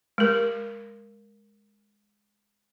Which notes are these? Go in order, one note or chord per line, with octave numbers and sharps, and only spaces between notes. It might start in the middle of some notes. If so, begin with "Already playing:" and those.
G#3 A#4